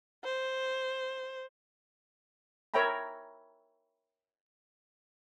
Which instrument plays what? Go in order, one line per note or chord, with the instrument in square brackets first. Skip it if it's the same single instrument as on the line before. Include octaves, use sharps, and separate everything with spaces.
[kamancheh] C5
[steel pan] A#4 C#5 E5 G5 A#5 B5